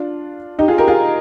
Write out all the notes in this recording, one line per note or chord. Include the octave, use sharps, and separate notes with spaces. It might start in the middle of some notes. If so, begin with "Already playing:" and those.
Already playing: D4 F4
D#4 G4
F4 G#4
G4 A#4
F4 G#4